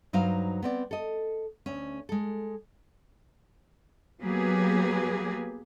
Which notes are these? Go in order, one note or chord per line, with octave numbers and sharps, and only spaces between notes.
G2 F#3 D#4 C5 F5
B3 C4 D5
A4 D#5
D2 C#4
G#3 A4
F#3 A#3 B3 G4 G#4 B4